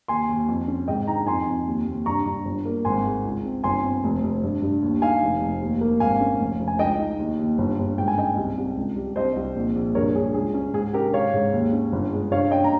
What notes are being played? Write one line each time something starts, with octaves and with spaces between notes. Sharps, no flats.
D#2 G#5 C6
D#2
F2
C#4
G#2 D#5 G5
D#4 G5 A#5
F2 G#5 C6
F2
D#2
D#2
G2 A#5 C#6
G2
G1
A#3
G#1 G#5 C6
G#3
C#2
C4
G1 G#5 C6
C4
F1
F1
G2
G2
D#2
D#4 F5 G#5
F1
F1
D#2
A#3
G#1 F5 G#5
C#4
F1
F1
G#5
C#2 D#5 G5
D#4
D#2
D#2
G1
G1
G#2 G5
G#5
C#4 D#5 G5
C2
C2
C#2
G3
C2 C5 D#5
C2
A#1
A#1
G2 A#4 C#5
G2 G#4
C#2 G#4
C#4
G#2 G#4
C#4 G4 A#4
G#2 C#5 F5
G#2
D#2
C#4
G1
G#3
G2 C#5 F5
C#4 D#5 G5
A#5